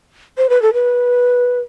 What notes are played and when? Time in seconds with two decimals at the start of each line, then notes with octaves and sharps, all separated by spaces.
0.38 C5
0.49 B4
0.62 A4
0.73 B4